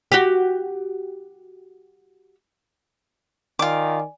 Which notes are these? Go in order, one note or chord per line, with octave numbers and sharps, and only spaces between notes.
F#4 G4
D#3 F4 D5 G#5 D6